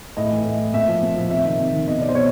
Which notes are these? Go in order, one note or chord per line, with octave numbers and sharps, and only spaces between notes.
A2 D#5
E3
A2
E3
A#2 E5
F3
A#2
F3
C3 E5
D#3
C3
D#3
B2 D#5
D5
C5
B2 C#5